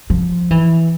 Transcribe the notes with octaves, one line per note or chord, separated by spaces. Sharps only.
F3
E3